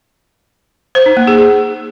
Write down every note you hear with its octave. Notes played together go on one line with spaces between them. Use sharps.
C5
D#4
A#3
G#4
G#4